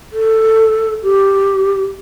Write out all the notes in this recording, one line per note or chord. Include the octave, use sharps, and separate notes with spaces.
A4
G4